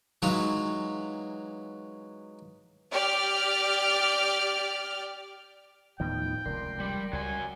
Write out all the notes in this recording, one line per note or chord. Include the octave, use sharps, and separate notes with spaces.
E3 F#3 G#3 D#4 F4
G4 D5 F6
D#2 A2 D#3 F3 B3 D#4 G5
F1 C#2 A#4 D5 C6
G3
C#2 F#3 G3 G#5